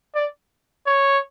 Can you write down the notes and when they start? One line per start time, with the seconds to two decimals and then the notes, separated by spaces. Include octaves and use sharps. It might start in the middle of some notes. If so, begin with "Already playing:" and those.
0.15 D5
0.87 C#5